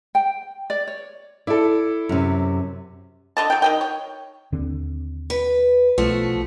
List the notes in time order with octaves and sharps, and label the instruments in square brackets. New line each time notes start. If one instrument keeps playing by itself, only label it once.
[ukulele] G5
D5
C#5
[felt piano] E4 A4 [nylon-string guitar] D5
[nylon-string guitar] F#2 C3
[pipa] D3 D#5 A5
F#3 G5
D#3 D#5 G5
C#5
[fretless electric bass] D#2 D3 C4
[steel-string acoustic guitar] B4
[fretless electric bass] B1 [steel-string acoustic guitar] F3 A3 F#4